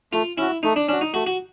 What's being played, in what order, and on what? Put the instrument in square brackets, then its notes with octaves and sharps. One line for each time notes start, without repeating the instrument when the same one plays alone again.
[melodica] A3 [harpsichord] F4
[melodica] C#4 F#4 [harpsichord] E4
[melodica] A3 [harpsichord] D#4
[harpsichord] D4
[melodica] C#4 [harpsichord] D4
[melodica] F#4
[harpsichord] D#4
[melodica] A3 [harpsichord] F#4
[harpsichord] F#4